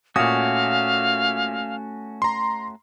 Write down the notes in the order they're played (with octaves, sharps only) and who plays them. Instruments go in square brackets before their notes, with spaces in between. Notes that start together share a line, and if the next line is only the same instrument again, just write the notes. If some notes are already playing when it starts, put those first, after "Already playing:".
[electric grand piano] A#2 D#6 [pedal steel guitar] A3 C#4 F#4 [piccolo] F5
[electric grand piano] A#5 C6